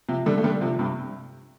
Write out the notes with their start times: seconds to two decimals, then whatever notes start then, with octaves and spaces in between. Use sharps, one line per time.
0.09 C3 F3
0.26 D3 G3
0.38 A3
0.44 D3 G3
0.61 C3 F3
0.79 G2 C3